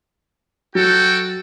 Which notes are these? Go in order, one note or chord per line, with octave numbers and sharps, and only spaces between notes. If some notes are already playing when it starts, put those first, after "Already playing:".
F#3 F#4 A4 G5